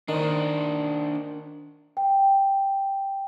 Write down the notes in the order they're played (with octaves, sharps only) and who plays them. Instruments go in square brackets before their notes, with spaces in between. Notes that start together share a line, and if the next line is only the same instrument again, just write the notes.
[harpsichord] D#3 [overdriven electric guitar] D4 C5
[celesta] G5